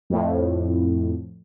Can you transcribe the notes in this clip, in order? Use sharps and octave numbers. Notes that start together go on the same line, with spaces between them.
F2 A2